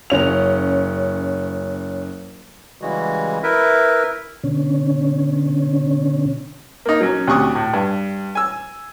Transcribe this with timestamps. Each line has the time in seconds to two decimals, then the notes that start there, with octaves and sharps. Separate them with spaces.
0.10 F#1 C#4 F7
2.82 C#3 E3 G3 G#3 F#4
3.43 E4 A#4 B4 E5
4.44 B2 D3 C#4
6.86 A#3 D#4
7.01 F#3 C#4
7.27 D2 C3 C#6 D#6
7.55 A2
7.73 G2
8.35 G#5 E6